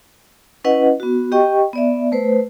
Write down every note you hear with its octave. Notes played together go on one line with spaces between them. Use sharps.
C#4 E4 B4 D#5 F#5
B3 F#4
G4 D#5 G5 C#6
B3 D5 E5
A3 B4 C5